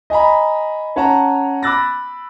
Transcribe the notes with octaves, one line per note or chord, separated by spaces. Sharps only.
D#5 G#5 A#5 B5
C#4 C#5 F#5 A5 A#5
B5 D6 E6 F#6 A6 A#6